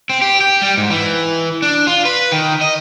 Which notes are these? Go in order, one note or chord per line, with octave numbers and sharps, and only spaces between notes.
C4
G4
G4
G3
G#2
E3
D4
F4
B4
D#3
D#5